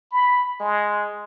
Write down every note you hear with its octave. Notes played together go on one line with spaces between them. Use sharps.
B5
G#3